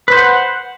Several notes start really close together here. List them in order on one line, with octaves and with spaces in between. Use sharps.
B4 C5 F#5